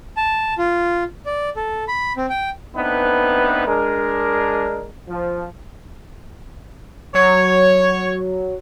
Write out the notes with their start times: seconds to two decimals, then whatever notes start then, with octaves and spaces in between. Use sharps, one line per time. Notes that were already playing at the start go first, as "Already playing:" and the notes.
0.17 A5
0.58 F4
1.26 D5
1.56 A4
1.88 B5
2.17 C4
2.30 G5
2.75 A3 B3 C4 D4 D#4 B4
3.67 G#3 D4 A#4
5.09 F3
7.14 F#3 C#5